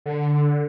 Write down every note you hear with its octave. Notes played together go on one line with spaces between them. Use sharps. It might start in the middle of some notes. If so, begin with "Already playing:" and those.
D3